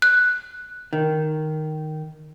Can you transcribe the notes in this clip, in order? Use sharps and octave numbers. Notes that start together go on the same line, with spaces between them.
F#6
D#3